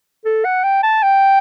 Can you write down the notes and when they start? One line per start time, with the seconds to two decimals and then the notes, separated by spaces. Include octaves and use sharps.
0.25 A4
0.45 F#5
0.64 G5
0.83 A5
1.03 G5